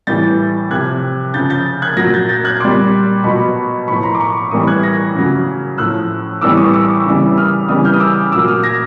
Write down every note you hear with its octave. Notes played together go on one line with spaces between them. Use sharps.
A2 E3 G3 G6 A6
C3 F3 F#6 G#6
C#3 F3 G6 A6
G6 A6
F#6 G#6
A#2 F#3 G#6 A#6
G6 A6
G6 A6
F#6 G#6
A#2 G3 C6 D6
B2 F#3 B5 C#6
A2 F3 B5 C#6
A#5 C6
D6
B5 C#6
A2 E3 G3 C#6 D#6
F#6 G#6
G#6 A#6
C#3 F#3
A2 F3 E6 F#6
A2 E3 G3 D6 E6
C#6 D#6
D6 E6
C#3 E3 G3
D#6 F6
C#3 E3 G3 D#6 F6
F6 G6
D#6
D6 E6
A#2 F#3 D6 E6
D#6 F6
G#6 A#6